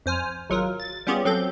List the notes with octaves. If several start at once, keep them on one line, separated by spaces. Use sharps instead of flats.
F2 C5 G#5 F6
G#1 F#3 F4 A#4
A6
G3 B3 C#4 F4 G4 G#4
F#3 C4 A4 G6